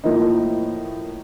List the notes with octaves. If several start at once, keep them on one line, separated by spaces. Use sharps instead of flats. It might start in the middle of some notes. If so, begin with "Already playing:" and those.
A2 F3 A#3 D#4